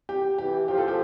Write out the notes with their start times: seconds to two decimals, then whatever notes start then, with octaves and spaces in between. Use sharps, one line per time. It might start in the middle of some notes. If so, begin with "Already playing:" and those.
0.09 G4
0.38 E3 G4
0.68 F3 G4
0.78 A4
0.88 G4